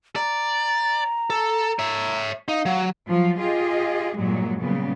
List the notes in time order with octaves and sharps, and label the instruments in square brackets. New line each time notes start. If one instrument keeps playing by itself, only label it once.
[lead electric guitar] D5 [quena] A#5
[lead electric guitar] A4
C#5 E5
[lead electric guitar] D#4 [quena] F5
[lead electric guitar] F#3
[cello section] F3 F#3 F4
F4 G4 G#4 D#5
G2 A#2 F#3 G#3
A#2 C#3 F#3 G3 B3